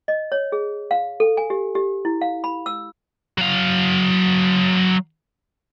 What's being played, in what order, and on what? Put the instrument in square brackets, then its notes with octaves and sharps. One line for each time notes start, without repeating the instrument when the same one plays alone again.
[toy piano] D#5
C#5
G#4
F5
A4
G#5
G4
G4
E4
F5
B5
E6
[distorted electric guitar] F#3 F5